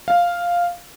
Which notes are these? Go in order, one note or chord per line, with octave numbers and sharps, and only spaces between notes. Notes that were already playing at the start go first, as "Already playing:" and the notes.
F5